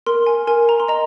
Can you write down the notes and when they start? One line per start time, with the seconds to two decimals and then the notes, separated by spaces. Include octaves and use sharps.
0.07 A#4 C6
0.27 G#5
0.47 A#4 G#5
0.69 A#5
0.80 C6
0.88 D#5 A#5